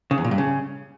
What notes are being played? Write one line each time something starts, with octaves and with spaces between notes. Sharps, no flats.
C#3
E2
A#2
G2
C#3